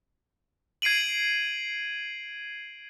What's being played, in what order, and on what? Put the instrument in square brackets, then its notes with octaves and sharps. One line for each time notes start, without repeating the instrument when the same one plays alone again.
[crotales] G#6 C7 D7 D#7 F#7